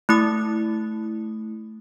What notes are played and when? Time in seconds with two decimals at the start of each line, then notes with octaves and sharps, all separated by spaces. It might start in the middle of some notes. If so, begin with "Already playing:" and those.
0.09 A3 E4 D#6